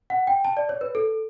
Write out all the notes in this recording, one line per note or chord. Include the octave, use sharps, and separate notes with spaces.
F#5
G5
A5
D5
C#5
B4
A4